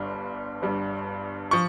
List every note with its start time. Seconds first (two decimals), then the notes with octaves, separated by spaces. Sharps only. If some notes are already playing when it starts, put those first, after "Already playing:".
Already playing: G1 G2 G3
0.62 G1 G2 G3
1.51 F3 C#6